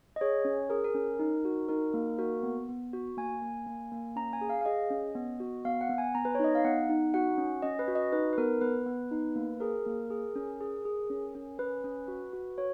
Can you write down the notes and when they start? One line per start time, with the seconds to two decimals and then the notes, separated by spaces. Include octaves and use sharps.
0.16 D#5
0.21 G#4 C#5
0.45 C#4
0.70 G#4 A#4
0.84 A#4
0.95 C#4
1.19 D#4
1.45 F#4
1.68 D#4 A#4
1.94 A#3
2.18 F#4 A#4
2.43 B3
2.69 B3
2.93 F#4
3.17 A#3 G#5
3.42 A#3
3.66 A#3
3.92 A#3
4.16 C#4 A#5
4.33 G#5
4.41 G#4
4.50 F5
4.61 F5
4.65 G#4 D#5
4.90 C#4
5.15 B3
5.40 F#4
5.65 B3 F5
5.81 F#5
5.89 B3
5.98 G#5
6.15 B3 A#5
6.25 B4
6.35 C#5
6.39 D#4 D#5
6.55 F5
6.64 B3 F#5
6.89 D#4
7.14 F#4 F#5
7.38 C#4
7.62 C#4 D#5
7.79 B4
7.88 F#4
7.95 D#5
8.13 D#4 B4
8.33 B4
8.38 B3 A#4
8.61 B3 B4
8.86 B3
9.11 D#4
9.36 A#3
9.60 G#4 A#4
9.86 A#3
10.10 G#4
10.35 C#4
10.61 G#4
10.85 G#4
11.10 C#4
11.35 C#4
11.58 C#4 B4
11.84 C#4
12.08 F#4
12.33 F#4
12.58 F#4 C#5